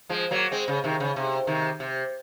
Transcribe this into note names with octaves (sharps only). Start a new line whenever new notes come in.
F3 G#3
F#3 A#3
G#3 C4
C#3
C3 D#3
C#3
C3
C3 D#3
C3